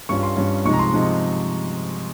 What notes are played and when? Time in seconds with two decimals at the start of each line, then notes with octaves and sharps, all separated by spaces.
0.09 G2 G3 C#4 F4 C#6
0.23 C6
0.37 G2 G3 C#4 F4
0.65 C3 F3 G#3 D#4 C#6
0.73 A#5
0.79 C6
0.93 C3 F3 G#3 D#4